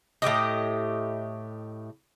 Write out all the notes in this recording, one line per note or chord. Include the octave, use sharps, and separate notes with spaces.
A2 F#3 G4 D#5